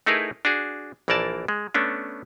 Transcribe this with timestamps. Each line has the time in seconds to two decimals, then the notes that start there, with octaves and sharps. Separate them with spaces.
0.06 A3 D#4 E4 G#4 A#4 B4
0.45 D4 F#4 G#4
1.08 A#1 E3 A#3 A#4 D5 A5
1.48 G#3
1.74 A3 B3 C#4 D4